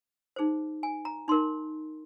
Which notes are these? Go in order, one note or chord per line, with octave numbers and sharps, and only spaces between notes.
D#4 G#4 C5
G#5
A#5
D#4 A#4 C6